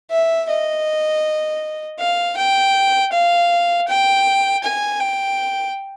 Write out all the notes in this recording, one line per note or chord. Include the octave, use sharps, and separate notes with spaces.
E5
D#5
F5
G5
F5
G5
G#5
G5